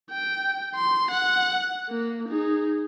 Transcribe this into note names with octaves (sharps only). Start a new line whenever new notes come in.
G5
C6
F#5
A#3
D#4 G#4